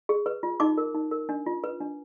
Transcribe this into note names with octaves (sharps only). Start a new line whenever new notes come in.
G#4
B4
F4
D#4 D6
A#4
D#4
A#4
D4
F4
B4
D4